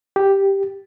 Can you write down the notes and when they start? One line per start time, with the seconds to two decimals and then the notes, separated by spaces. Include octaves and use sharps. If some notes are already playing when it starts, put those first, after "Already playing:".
0.16 G4